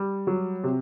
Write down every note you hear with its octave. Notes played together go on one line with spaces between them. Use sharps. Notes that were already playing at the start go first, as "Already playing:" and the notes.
Already playing: G3
F#3
C3